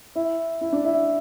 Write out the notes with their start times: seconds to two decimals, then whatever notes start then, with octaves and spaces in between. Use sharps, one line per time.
0.15 E4
0.61 E4
0.73 D4
0.85 E4